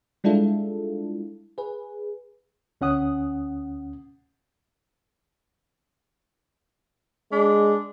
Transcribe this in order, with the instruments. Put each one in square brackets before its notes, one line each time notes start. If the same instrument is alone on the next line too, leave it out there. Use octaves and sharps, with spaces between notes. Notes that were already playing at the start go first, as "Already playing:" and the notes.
[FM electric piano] G3 G#3 D4 E4 F4 A4
G#4 B4
[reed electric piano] D2 C#4 F#5 D#6
[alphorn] G#3 [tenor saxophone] D4